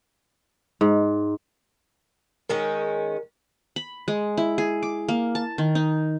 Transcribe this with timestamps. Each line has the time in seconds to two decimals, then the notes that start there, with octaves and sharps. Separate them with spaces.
0.81 G#2
2.49 D#3 G#3 C#4 A#4
3.76 B5
4.08 G#3
4.37 E4
4.58 G#4
4.83 D6
5.09 A#3
5.35 A5
5.58 D#3
5.75 D#4